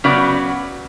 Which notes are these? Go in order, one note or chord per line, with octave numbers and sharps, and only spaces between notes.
C#3 F#3 B3 D5